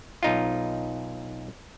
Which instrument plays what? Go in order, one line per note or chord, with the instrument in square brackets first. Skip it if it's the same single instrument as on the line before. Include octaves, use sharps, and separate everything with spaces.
[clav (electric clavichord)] B1 D#4 F4